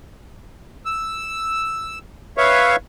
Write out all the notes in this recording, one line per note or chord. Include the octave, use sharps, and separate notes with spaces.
E6
B4 C#5 E5 F5 C#6